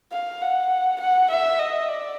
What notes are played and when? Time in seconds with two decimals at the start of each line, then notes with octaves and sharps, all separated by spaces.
0.12 F5
0.41 F#5
1.00 F#5
1.30 E5
1.59 D#5
1.88 D5